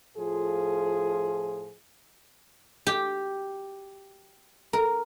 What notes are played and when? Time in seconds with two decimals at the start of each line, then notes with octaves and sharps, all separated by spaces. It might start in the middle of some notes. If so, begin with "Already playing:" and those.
0.16 A2 F3 F4 G#4 A4
2.87 G4
4.73 A#4